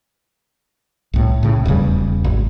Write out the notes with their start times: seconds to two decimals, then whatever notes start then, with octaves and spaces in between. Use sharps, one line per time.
1.13 C2 A2
1.43 A2 C#3
1.66 D#1 E2 C#3 G3
2.24 G#1